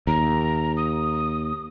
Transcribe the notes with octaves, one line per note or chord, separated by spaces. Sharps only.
D#2 A#5
D#6